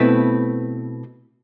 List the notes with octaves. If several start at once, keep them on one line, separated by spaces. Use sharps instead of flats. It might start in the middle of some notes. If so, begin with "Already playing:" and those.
Already playing: B2 A3 C4 E4 B4